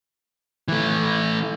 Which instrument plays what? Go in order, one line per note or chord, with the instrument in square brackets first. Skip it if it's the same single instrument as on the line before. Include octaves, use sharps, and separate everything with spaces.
[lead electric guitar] E3 A3